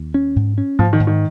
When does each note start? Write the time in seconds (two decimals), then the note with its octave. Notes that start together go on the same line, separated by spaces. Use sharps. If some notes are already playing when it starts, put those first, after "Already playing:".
Already playing: D#2
0.14 C#4
0.36 G#2
0.58 C#4
0.79 G#2 F3
0.93 D#3
1.00 G#2
1.07 D#3